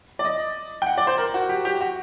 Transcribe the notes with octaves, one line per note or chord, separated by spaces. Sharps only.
D5
D#5
G5
F#5
D5
C5
A#4
F#4
G4
G4
F#4